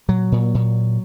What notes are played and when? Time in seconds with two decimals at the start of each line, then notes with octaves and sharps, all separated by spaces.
0.08 A#2 F#3
0.32 A#2
0.54 A#2